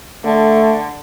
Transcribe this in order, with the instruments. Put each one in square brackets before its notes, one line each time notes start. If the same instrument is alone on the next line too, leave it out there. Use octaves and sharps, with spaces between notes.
[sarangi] D3 [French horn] A3